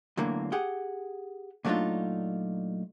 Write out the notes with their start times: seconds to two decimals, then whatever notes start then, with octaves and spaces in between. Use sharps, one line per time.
0.17 E2 A2 D3 E3 F#3 A#3
0.52 G4 G#4 F#5 G5
1.65 A#2 F#3 A3 D4 D#4 F4